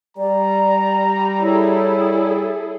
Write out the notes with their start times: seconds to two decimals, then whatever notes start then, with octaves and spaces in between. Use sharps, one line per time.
0.17 G3 D5 A#5
1.42 E4 G#4 A4 C#5